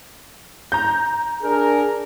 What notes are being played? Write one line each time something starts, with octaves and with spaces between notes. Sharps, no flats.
A#5 G6
D4 G#4 A#4